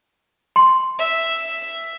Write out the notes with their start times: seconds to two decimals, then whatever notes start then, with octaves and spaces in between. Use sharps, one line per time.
0.56 C6
0.99 E5